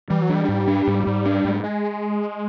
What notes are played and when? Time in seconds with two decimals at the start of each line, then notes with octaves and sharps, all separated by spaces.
0.10 E3 G3
0.22 F#3
0.29 D4
0.35 G3
0.48 G#2
0.67 D4
0.87 G#2
1.07 G#2
1.26 D4
1.45 G#2
1.63 G#3